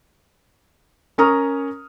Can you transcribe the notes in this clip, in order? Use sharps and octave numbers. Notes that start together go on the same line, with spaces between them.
C#4 A#4 A#5 C#6 D#6 F6